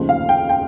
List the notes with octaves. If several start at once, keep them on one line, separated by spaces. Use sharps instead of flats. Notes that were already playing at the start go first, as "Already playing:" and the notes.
Already playing: F1 D#2 C#3 F3
F5
G5
G5